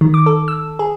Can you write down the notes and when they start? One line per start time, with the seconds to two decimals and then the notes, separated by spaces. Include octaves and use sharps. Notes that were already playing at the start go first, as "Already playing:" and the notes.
0.01 D#3
0.14 D6
0.26 A4
0.48 E6
0.79 G#4